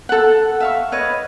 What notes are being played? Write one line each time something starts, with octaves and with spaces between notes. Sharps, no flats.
A4 F#5
E5 F5 C#6
B4 C#5 D#5